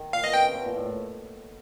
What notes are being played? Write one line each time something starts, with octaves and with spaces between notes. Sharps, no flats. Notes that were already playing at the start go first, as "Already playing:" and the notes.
Already playing: D#3
A#2 F5
B2 D#5
C#3 G5
C3
B2
A#2
A2
A2